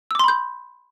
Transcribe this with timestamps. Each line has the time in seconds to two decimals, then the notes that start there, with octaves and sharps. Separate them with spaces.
0.11 E6
0.15 D6
0.19 C6
0.24 B5
0.28 G6